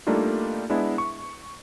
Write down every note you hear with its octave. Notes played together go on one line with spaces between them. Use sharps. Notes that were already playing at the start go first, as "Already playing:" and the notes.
G3 A3 A#3 D4 D#4 F4
G#3 B3 D4 E4
C#6